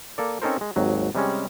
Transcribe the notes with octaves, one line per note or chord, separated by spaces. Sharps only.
A#3 A4 D5
C4 C#4 D#4 A4 A#4 C5
G#3
G#1 D#2 F#3
C3 G3 G#3 C#4